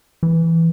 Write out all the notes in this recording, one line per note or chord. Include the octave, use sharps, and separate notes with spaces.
E3